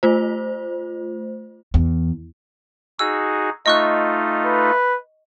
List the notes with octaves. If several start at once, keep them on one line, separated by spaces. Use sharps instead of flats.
A3 F4 C5
E2
D#4 F#4 G#4 E6
A3 D#4 F4 D#5 C#6 F#6
B4